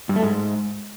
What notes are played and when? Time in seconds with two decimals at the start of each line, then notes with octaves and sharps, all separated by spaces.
0.09 G2
0.16 A3
0.23 G#2